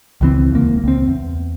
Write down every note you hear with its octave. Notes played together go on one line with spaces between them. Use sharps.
C#2 E3 C4
D#1 C#2 A#3
C#2 C4
E2